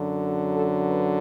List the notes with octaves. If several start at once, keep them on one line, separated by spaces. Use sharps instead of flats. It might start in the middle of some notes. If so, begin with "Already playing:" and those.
Already playing: F#2 D3 F#3
A4
A4
B4